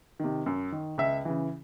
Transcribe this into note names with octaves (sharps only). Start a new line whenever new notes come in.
C3 D#3
F#2
D#3
C#2 E5
C#3 E3